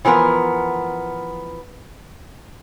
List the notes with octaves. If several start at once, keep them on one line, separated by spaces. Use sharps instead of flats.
E3 F3 B3 A#4